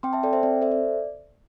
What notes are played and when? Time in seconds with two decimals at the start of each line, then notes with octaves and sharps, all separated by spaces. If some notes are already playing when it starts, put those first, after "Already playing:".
0.03 C4 G5 C6
0.13 E5 A5
0.23 A4 D5 G5
0.33 C5 E5
0.43 C4 D5
0.61 A4 C5 E5
0.72 D5